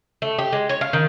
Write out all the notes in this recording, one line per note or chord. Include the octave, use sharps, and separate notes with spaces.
A3
G4
G#3
C#5
F5
D#3